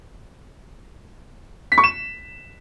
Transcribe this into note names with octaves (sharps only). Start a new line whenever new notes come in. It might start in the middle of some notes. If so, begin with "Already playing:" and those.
B6
C#6
E7